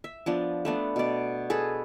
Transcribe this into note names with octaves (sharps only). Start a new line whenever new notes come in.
E5
F3 B3 D4
A3 B3 D4
B2 D5
G#4 A4 B4